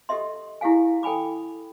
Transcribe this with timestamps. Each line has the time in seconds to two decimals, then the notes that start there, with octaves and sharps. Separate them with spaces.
0.09 G4 A4 D#5 E5 C6
0.61 E4 G4 G#4 F5 G#5
1.03 A4 G5 G#5 B5 D6